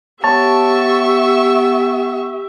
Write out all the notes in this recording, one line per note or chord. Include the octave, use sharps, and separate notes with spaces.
B3 G4 C#5 E5 A5 C#6 E6